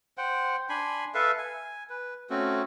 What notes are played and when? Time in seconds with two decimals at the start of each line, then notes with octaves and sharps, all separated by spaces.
0.18 C5 F#5 G5
0.69 D4 G#5 B5 C6
1.14 A4 B4 E5 F5
1.38 G#5
1.89 B4
2.30 A3 C4 C#4 F#4